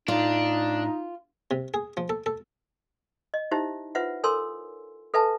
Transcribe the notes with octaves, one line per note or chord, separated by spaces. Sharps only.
A2 D4 D#4 F4
C3
G#4
F3
A4
A4
D#5
D#4 E4 G4 C5 E5
F4 B4 C5 E5 F#5
A4 A#4 C#5 G#5 C6 E6
A4 B4 E5 G#5 A5